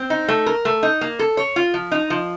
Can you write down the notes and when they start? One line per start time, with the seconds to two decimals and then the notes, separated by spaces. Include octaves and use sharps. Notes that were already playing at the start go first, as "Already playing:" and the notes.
Already playing: C4
0.10 D#4
0.28 A3
0.46 A#4
0.65 A3
0.83 D#4
1.01 A#3
1.19 A4
1.37 C#5
1.56 F4
1.74 F3
1.92 D#4
2.10 F3